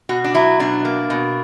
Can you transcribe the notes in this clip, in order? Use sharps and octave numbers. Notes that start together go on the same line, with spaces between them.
B2 F#4
D4
F#3 E4
B2 D4
A#3
B2